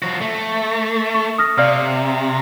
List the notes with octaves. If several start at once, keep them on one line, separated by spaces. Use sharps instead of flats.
F3 F#4
A3
C#6
D#6 F6 A#6
C3 D5 F5 F6